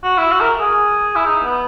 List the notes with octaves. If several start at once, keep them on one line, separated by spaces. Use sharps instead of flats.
F#4
E4
F#4
A#4
G#4
E4
D#4
B3